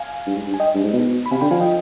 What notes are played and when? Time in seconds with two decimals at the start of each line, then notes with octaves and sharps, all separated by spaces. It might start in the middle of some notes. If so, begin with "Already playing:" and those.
Already playing: F5 G#5
0.27 G2
0.35 G#2
0.46 G2
0.54 G#5
0.60 D#5 G5
0.74 G2
0.83 G#2
0.93 B2
1.26 B5
1.31 C3 F5 G#5
1.41 D3 G5 B5
1.51 F3 F5 G#5
1.61 D#5 G5